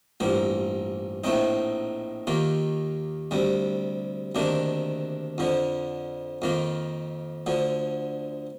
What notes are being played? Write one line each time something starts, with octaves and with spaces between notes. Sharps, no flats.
A1 G2 F3 A#3
A#1 A2 A3 C4 D#4
D#2 D#3 A#3 F4
D2 C3 G3
D2 C3 D#3 A#3 D4
F2 D3 F3
F2 D#3 A#3 F4
D2 D3 F3